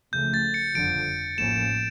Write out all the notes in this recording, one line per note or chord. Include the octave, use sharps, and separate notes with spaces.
C#2 C#3 F3 A3 G6
A6
C#7
G1 F2 D3 F3 D7
A1 A2 F3 A#3 C#4 E7